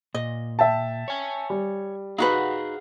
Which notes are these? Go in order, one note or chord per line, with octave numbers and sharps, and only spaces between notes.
A#2 D#5
E5 G5 A5
C#5 G#5
G3
D#4 F#4 G#4 B4 F5 F#5